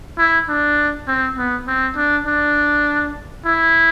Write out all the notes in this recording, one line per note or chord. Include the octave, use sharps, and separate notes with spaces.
E4
D4
C4
B3
C4
D4
D4
E4